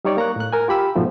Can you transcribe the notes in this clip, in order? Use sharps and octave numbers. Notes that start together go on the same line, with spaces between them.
G3 D#4 C#5 D5
A#3 A#5 C#6 F#6
A2 F#6
A#4 G#5
F4 G4 B5 E6
G#2 B2 F3 A3